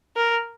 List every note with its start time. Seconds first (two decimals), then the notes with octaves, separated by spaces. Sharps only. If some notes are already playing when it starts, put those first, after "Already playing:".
0.16 A#4